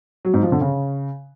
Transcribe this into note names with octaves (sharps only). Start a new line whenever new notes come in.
F#3
G#2
F3
D3
C#3